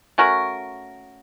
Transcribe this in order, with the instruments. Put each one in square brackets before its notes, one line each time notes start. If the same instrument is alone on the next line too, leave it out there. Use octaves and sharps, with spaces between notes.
[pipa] A3 C#4 F#4 A#4